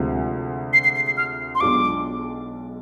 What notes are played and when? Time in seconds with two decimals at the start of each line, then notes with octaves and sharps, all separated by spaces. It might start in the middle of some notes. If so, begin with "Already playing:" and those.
Already playing: D2 C3 F3 G#3
0.73 C7
0.84 C7
0.96 C7
1.06 C7
1.17 F6
1.55 C6
1.60 B1 B2 G#3 D4 F4 D6